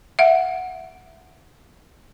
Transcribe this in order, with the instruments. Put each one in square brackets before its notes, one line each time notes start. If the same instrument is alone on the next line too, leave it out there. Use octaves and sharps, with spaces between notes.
[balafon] E5 F#5